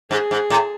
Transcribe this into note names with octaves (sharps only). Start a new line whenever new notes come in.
G#2 G#4
G#2
A2